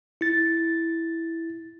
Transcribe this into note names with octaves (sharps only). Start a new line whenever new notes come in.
E4 A6